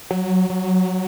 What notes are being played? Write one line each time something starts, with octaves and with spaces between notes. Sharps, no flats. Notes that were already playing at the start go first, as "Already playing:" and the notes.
F#3
F#3